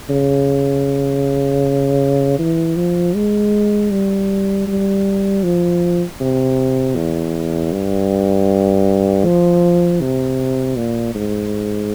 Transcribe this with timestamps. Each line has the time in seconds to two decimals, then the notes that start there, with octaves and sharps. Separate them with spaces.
0.10 C#3
2.39 E3
2.77 F3
3.15 G#3
3.91 G3
4.67 G3
5.44 F3
6.20 C3
6.96 E2
7.72 G2
9.25 F3
10.01 C3
10.77 A#2
11.15 G#2